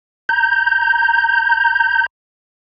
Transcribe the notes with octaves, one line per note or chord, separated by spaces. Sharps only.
A#5 G6